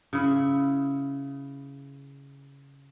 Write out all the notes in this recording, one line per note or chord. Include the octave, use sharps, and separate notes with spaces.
C#3 E4